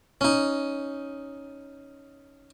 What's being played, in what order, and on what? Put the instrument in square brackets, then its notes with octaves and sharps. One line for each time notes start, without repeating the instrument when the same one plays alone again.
[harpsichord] C#4 D#4